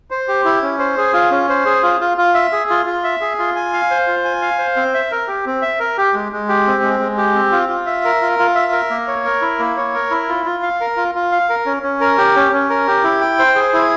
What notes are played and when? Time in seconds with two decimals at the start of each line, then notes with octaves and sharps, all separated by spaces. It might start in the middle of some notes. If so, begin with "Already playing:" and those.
0.11 C5
0.28 G4
0.45 E4
0.62 C#4
0.79 C5
0.98 G#4
1.14 F4
1.31 C#4
1.49 C5
1.65 G#4
1.83 F4
2.01 F4
2.18 F4
2.34 E5
2.52 G#4
2.70 F4
2.86 F4
3.04 E5
3.21 G#4
3.39 F4
3.56 G#5
3.73 F5
3.91 C5
4.07 F4
4.24 G#5
4.42 F5
4.59 C5
4.76 C4
4.94 E5
5.11 A#4
5.28 G4
5.46 C4
5.62 E5
5.80 A#4
5.98 G4
6.14 G#3
6.32 G#3
6.49 G4
6.67 C4
6.83 G#3
7.00 G#3
7.17 G4
7.35 C4
7.52 F4
7.69 F4
7.86 E5
8.05 A#4
8.22 F4
8.39 F4
8.55 E5
8.72 A#4
8.90 A#3
9.07 C#5
9.25 A#4
9.41 E4
9.59 A#3
9.77 C#5
9.94 A#4
10.11 E4
10.29 F4
10.46 F4
10.63 F5
10.81 A#4
10.97 F4
11.15 F4
11.32 F5
11.49 A#4
11.66 C#4
11.83 C#4
12.01 A#4
12.18 G4
12.35 C#4
12.53 C#4
12.70 A#4
12.87 G4
13.04 E4
13.21 G5
13.39 C5
13.55 G#4
13.73 E4